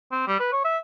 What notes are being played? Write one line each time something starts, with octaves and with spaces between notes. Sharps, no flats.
C4
G3
B4
C#5
E5